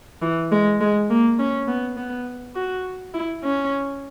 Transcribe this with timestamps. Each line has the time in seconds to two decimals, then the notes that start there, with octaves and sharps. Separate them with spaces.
0.22 E3
0.52 G#3
0.81 G#3
1.10 A#3
1.39 C#4
1.68 B3
1.97 B3
2.56 F#4
3.14 E4
3.44 C#4